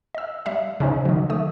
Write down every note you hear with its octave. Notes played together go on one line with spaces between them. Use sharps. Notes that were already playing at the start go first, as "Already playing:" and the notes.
D#5 E6
G3 E5 F5
C#3 C#4 D#4 C5
D#3 F#3
A3 D#6